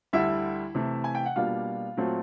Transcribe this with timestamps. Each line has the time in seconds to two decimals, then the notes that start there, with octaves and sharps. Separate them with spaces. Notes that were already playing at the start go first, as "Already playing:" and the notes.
0.13 D2 D3 G3 E4 E5
0.75 C3 E3 A3
1.04 G#5
1.15 G5
1.26 F#5
1.36 B2 G3 A#3 D4 F4 F5
1.97 A#2 F#3 A3 C4